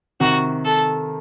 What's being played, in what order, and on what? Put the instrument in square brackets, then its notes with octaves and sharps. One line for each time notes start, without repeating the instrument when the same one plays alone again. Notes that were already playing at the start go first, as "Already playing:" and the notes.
[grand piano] C3 D#3 [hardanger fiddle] F#4
[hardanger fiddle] A4